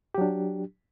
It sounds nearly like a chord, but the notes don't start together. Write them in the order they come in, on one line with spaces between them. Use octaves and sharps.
G4 F#3 D4